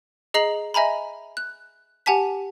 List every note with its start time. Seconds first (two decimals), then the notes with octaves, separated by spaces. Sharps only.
0.34 G#4 D#5 A#5 C7 F#7
0.74 D#5 E5 G#5 A#5 B5
1.37 F#6
2.06 G4 F#5 G#5 A5 B6